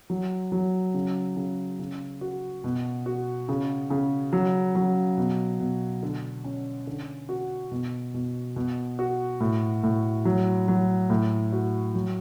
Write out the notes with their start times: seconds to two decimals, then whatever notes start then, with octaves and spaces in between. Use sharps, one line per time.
0.10 F#3
0.52 F#3
0.94 C#3
1.36 C#3
1.79 C#3
2.21 F#4
2.64 B2
3.06 F#4
3.49 C#3
3.90 C#3
4.33 F#3
4.75 F#3
5.18 B2
5.60 B2
6.03 D3
6.44 C#4
6.87 D3
7.29 F#4
7.71 B2
8.14 B2
8.56 B2
8.99 F#4
9.40 A2
9.83 A2
10.25 F#3
10.68 F#3
11.10 A2
11.52 F#4
11.95 F#3